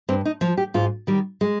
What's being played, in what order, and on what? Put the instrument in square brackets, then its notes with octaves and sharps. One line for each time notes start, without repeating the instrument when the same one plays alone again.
[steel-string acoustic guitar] G2 C4
D#4
F3 F4
G4
G#2 F4
D#3 G3
G#3